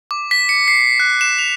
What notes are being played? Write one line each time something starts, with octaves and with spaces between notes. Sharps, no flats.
D6
B6
C#7
C7
F#6
E7
F7